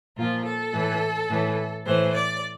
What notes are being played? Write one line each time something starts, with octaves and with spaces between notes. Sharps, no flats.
A#2 F3 F4
A4
A2 E3
A2 E3
A2 E3 C5
D5